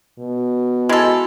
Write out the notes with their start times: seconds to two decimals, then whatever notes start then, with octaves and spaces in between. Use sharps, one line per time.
0.19 B2
0.89 G#3 E4 F#4 A4 B5